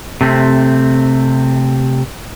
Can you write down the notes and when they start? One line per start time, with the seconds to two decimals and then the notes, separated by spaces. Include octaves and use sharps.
0.21 C3 A3 C4